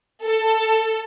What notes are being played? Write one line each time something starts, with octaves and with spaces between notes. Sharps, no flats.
A4